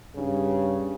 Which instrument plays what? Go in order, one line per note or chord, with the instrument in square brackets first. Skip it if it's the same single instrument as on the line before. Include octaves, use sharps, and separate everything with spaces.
[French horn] G2 [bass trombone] C#3